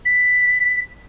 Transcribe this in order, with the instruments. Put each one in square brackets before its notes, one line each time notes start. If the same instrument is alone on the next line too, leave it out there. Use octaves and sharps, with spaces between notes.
[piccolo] B6